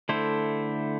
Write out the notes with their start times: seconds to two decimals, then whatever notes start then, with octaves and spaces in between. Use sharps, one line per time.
0.09 D3 A3 E4 A4 C5